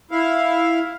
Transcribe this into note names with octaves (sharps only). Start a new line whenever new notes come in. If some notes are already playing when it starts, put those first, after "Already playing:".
E4 F5